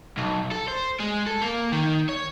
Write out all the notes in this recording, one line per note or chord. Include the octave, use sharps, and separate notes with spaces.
B1
A4
C5
G#3
A4
A#3
D#3
C#5